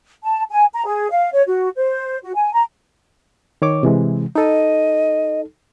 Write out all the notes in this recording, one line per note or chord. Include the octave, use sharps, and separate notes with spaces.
A5
G#5
A#5
G#4
F5
C#5
F#4
C5
F#4
G#5
A#5
D#3 C#5 D6
C3 E3 G#3
D#4 A4 D#5